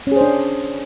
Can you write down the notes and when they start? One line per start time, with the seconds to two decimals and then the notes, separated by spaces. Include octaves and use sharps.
0.07 C#4
0.12 G#4
0.16 C5
0.21 D4